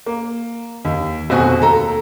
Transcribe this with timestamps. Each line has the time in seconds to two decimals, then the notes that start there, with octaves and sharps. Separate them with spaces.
0.06 A#3
0.85 D#2
1.30 F1 B2 C4 F#4 G#5
1.61 D#2 A4 A#5